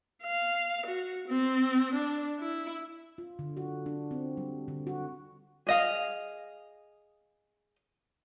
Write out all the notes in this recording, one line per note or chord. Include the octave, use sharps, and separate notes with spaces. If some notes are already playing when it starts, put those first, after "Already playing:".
F5
F#4
C4
D4
E4
F4
D3
F#4
D4
C4
G3
D3
F#4
G#4 D#5 F5